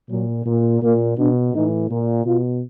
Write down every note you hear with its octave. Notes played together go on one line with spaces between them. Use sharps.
A#2 F#3
A#2
A#2 A#3
B2 D4
A2 E3 D#4
A#2
B2 F4